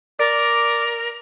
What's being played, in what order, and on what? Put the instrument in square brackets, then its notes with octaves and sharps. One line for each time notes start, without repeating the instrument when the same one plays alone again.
[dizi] A#4 [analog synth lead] D5